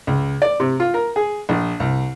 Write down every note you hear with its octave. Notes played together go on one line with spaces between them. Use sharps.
C#2
D5
C3
F4
A#4
G#4
A#1
C2